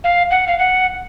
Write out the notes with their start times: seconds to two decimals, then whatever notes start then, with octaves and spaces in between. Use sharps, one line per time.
0.04 F5
0.31 F#5
0.48 F5
0.58 F#5